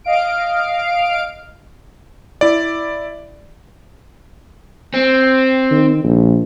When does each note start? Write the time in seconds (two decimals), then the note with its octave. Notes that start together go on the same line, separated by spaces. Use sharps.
0.04 D#5 F5 D7
2.41 E4 D5
4.94 C4
5.71 D#3
6.04 A#1